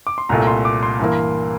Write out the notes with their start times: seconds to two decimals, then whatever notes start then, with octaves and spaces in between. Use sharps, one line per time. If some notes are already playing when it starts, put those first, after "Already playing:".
0.07 D6
0.18 C6
0.29 C2 A#2 A3 A#5
0.47 C6
0.65 D6
0.83 C6
0.99 G2 E3 A#3